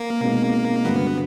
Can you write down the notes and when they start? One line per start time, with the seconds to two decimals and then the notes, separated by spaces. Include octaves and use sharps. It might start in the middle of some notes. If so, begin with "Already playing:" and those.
Already playing: A#3
0.20 B2 G#3 C4 D#4
0.84 G2 D3 F#3 B3